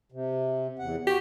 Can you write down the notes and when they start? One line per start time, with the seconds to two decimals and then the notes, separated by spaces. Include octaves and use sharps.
0.12 C3
0.79 E2 F#5
1.07 F#4 G4